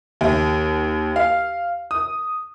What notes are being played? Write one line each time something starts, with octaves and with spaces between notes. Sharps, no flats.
D#2
F5
D#6